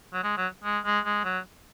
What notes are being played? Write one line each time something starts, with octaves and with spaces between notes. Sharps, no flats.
F#3
G#3
F#3
G#3
G#3
G#3
F#3